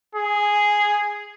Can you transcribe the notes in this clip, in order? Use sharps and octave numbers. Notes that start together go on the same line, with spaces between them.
G#4